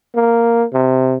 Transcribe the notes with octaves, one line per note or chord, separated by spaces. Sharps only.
A#3
C3